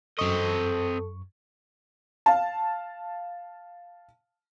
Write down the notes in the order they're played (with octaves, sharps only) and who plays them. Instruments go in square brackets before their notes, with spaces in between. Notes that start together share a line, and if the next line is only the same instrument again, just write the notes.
[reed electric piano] F#2 C#6 [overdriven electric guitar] C4 D#5 [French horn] A4
[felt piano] F5 A5